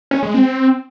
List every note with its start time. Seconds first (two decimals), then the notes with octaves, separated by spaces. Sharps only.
0.11 C#4
0.23 G#3
0.34 C4